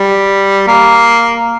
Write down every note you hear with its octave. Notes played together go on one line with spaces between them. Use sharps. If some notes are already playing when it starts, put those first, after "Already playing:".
Already playing: G3
A#3